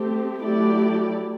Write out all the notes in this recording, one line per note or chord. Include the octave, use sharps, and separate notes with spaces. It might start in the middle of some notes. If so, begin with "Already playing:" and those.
Already playing: A3 C4 G4
F#3 A3 E4 G4 D5